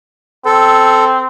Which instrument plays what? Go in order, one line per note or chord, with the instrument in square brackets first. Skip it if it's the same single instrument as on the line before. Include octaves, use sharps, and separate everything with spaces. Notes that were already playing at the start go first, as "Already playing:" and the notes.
[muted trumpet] C4 [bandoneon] A4